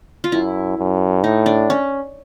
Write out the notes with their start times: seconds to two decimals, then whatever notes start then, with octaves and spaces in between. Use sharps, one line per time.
0.24 F4
0.32 F#2 E4
0.78 F#2
1.24 A2 D#4
1.46 D4
1.70 C#4